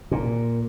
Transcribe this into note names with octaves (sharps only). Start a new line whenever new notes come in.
A#2